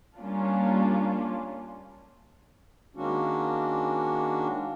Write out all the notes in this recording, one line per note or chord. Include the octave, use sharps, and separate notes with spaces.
G3 A#3 C#4 D4 F4
D#3 G#3 A#3 C#4 D4 F#4